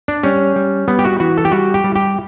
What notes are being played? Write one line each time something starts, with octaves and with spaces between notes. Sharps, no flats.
D4
G3 C#4
G3
G3 B3
G4
F#4
E3 F#4
A4
G4
G3 F#4
G4
G3
G4